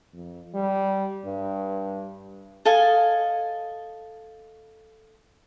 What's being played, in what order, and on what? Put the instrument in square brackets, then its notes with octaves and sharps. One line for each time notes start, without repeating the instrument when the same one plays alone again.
[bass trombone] F2
G3
G2
[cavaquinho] A4 D#5 F5 G#5